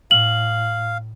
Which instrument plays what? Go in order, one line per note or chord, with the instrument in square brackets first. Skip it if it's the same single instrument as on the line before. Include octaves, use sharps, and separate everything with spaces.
[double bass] A2 [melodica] F5 [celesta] F#7